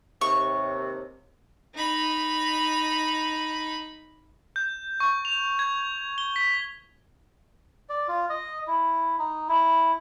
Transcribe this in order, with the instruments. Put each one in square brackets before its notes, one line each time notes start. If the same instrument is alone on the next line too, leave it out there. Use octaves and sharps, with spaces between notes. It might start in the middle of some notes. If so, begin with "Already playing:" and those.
[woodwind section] D#2 C3 [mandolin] C#6
[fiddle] D#4 B5
[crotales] G6
C#6
F7
G#6
G7
B6
[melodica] D5
F4
D#5
E4
D#4
E4